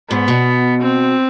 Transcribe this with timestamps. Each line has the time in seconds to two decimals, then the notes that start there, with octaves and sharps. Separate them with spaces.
0.10 G#2 B3
0.28 B2
0.81 C4